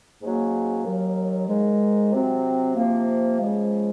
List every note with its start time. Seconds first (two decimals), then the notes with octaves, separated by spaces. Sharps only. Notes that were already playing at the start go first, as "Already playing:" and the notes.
0.21 G#2 F#3 A#3 C#4
0.85 D#2 D#3 F#3 A#3
1.48 G#2 D#3 G#3
2.12 C3 F#3 C4
2.76 C3 F3 A#3
3.40 C#3 F3 G#3